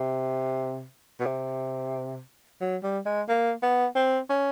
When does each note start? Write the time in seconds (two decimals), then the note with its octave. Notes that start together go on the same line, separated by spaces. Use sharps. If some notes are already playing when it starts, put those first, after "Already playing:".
Already playing: C3
1.20 B2
1.26 C3
2.61 F#3
2.83 G3
3.06 G#3
3.29 A#3
3.62 B3
3.95 C4
4.30 C#4